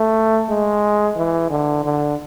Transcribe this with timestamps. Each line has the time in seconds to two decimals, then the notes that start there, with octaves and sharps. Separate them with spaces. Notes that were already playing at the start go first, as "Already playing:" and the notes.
Already playing: A3
0.49 G#3
1.17 E3
1.51 D3
1.84 D3